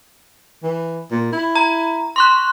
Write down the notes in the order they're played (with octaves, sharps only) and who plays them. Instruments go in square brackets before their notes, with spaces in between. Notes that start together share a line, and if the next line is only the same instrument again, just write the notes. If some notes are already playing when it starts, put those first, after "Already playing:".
[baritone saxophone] E3
A#2
E4
[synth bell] A#5
C6 C#6 F#6